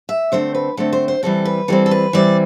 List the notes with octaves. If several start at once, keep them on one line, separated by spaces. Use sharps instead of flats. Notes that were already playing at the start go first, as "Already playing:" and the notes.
E5
D3 A3 C4 C5
B4
D3 A3 C4 A4
C5
C5
E3 G3 C4 A4
B4
E3 G3 C4 A4
A4
B4
E3 G3 C4 D5